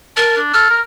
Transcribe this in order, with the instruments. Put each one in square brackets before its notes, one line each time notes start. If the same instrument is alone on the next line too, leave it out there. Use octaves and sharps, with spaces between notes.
[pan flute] A#4 [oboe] A5
[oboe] D4
[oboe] A4 [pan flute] F6
[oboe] A#4